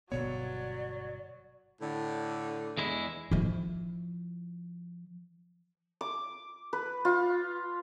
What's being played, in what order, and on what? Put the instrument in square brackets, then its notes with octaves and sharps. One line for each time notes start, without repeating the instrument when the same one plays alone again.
[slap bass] G1 B2 B3 [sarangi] F#3 [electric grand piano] C#5 [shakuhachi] D5
[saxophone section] A2 D3
[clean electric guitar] E2 G#3 E4
[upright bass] F3 E4
[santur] D6
B4
F4